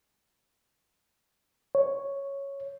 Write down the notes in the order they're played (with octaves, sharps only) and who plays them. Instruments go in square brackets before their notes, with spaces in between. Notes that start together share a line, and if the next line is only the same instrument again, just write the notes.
[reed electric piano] C#5